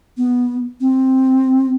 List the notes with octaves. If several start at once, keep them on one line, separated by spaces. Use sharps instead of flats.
B3
C4